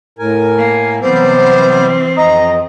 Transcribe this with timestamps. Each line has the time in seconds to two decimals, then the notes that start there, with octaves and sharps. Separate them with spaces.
0.19 A2 A#4 G#5
0.58 A#3
1.02 C3 E3 F#3 G3 B3 C4 C5
2.17 F2 D#5 A#5